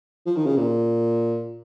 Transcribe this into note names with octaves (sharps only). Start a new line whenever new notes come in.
F3
D#3
C#3
A#2